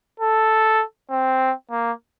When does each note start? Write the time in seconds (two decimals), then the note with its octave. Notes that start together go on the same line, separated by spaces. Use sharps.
0.20 A4
1.10 C4
1.71 A#3